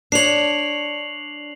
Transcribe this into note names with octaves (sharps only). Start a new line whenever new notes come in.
D4 C#5 C7 F7 F#7